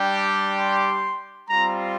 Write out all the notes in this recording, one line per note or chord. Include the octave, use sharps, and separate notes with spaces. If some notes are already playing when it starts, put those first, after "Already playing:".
Already playing: G3 D4 G4
C6
G3 C4 F4 A#5